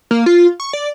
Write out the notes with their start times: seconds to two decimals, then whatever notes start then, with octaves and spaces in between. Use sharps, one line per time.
0.11 A#3
0.26 F4
0.60 C#6
0.73 D5